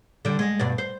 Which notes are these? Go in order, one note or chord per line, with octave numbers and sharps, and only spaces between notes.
D3 G3
G#3
G2 B2 D5
C5